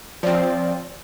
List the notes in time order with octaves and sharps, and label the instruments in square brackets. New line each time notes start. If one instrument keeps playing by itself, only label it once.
[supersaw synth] F3 C4 [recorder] D5